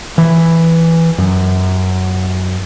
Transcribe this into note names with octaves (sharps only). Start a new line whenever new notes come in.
E3
F#2